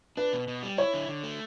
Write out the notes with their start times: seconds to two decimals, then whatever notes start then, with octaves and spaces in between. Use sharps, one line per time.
0.17 D4 B4
0.33 B2
0.48 B2
0.63 G3
0.78 E4 C#5
0.93 D3
1.08 D3
1.23 A3